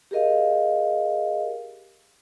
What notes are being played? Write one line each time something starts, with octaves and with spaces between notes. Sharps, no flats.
G4 G#4 A#4 D#5 F5